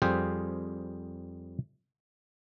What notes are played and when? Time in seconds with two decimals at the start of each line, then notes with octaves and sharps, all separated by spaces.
0.02 F2 G3 G4 G#4 C5 F5